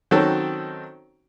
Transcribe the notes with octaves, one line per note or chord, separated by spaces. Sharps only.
D#3 F#3 C4 C#4 F#4 A4